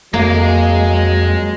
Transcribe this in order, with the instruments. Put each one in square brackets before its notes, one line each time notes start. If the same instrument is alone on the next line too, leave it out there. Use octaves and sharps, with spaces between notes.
[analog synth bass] F2 [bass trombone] F#3 [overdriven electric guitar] G#3 [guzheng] A#3